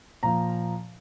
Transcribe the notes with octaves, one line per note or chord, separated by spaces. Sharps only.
A#2 F3 A#5